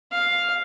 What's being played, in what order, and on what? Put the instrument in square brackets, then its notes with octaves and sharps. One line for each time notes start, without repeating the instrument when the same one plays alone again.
[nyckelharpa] F5